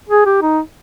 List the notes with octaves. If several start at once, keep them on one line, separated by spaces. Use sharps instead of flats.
G#4
G4
D#4